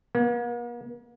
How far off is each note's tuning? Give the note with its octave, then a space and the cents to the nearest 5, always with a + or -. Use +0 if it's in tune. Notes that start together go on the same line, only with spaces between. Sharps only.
A#3 +45